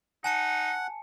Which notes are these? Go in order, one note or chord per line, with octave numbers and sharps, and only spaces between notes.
D#4 F#5 G#5 A5 C#7